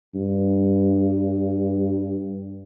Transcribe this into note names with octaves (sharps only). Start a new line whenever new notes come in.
G2